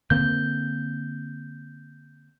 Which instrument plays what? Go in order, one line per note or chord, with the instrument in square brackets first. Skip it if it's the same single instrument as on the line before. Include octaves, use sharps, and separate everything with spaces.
[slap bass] D3 A#3 C4 [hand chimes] G6